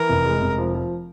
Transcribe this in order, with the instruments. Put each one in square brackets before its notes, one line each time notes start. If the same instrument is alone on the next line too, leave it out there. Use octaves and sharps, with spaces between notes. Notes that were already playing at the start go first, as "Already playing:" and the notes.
Already playing: [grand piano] E3 [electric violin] A#4
[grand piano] F1
G#3
F1
F3
F3